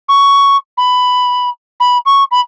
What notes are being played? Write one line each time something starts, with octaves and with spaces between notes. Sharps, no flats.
C#6
B5
B5
C#6
B5